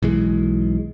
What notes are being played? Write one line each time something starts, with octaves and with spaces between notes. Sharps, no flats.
B1 E3 G#3